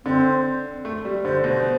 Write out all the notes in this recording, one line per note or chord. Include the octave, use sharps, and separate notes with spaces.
D3 C4
A3
G3
D3 C5
B2
C5